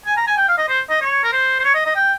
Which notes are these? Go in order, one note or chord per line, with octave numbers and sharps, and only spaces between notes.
G#5
A#5
G#5
G5
F5
D#5
C5
D#5
C#5
A#4
C5
C5
C#5
D#5
D#5
G5